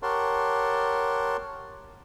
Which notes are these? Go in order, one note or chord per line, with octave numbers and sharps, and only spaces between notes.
G4 A#4 C#5 F#5 A5 C6